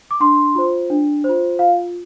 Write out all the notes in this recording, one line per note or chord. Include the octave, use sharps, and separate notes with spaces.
D6
D4 C6
F4 C5
D4
F4 C5
F4 F5